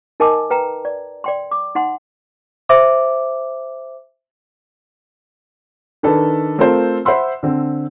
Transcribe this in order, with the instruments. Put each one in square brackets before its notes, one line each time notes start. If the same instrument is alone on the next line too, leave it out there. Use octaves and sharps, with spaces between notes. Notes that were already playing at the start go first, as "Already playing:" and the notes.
[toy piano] D#4 A#4 D#5 G#5 A5 D6
B4 G5 A#5
D5
D5 G5 C6
D6
D#4 F#5 C6
[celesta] C5 E5 D6
[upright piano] D#3 D4 A4 B4
A3 C4 F4 A4 A#4 C5
C5 E5 F#5 B5 C6 E6
D3 C4